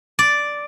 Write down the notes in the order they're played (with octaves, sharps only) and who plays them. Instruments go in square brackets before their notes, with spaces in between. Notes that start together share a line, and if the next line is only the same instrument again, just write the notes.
[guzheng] D5